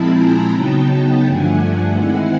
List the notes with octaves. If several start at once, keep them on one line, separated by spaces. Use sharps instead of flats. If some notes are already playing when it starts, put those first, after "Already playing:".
Already playing: A#2 F3 G#3 C4 E4 A5 B5
G#5 A#5
C#3 F#3 B3 D#4 G5 A5
G2 D3 F3 A3 D4 F#5 G#5
D#3 G#3 C4 E4